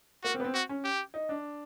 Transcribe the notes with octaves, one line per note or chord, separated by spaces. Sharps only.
A#3 F#4
C4
B3
C4
F#4
C#4
G4
D#4
D4